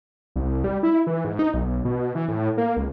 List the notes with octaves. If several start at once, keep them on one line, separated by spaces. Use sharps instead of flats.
C2
G3
E4
E3
G#2
D#4
B1
B2
E3
A2
A#3
C#2